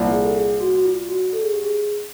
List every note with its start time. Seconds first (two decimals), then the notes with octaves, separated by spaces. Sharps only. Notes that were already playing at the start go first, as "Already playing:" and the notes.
Already playing: C2 A#2 F3
0.11 G#4
0.23 A4
0.36 G#4
0.60 F#4
0.75 F#4
0.85 F4
1.09 F#4
1.33 A4
1.43 G#4
1.54 G4
1.63 G#4